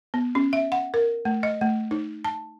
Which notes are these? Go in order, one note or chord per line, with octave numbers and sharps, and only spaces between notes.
B3
C#4
E5
F#5
A#4
A3
D#5
A3
D#4
A5